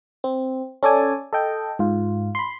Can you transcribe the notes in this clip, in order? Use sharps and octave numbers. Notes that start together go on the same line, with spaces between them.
C4
C#4 A4 D5 G#5
A4 D#5 G5
G#2 F4
B5 C6